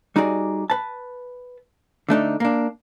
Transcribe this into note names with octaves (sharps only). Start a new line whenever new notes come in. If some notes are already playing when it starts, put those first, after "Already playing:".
G3 D#4 F#4 G#4 D5
B4 A5
D3 A3 D4 D#4
A#3 D4